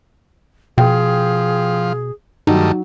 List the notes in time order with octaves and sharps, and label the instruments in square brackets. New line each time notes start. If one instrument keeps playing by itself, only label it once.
[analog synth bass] B2 [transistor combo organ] F3 [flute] G#4 [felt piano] G5
[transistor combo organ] G2 D#3 A3 [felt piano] F#3 [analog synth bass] D#4